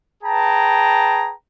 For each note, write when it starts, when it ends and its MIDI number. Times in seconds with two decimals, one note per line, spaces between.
0.23 1.32 68
0.23 1.32 71
0.23 1.32 79
0.23 1.32 81
0.23 1.32 82